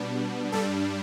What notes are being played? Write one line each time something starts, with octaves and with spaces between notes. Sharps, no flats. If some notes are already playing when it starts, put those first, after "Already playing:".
Already playing: B2 G3 B3 D4
G2 G3 D4 A4